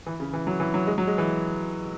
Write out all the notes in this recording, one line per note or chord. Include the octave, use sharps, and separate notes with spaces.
E3
C#3
E3
F#3
E3
F#3
G#3
F#3
G#3
E3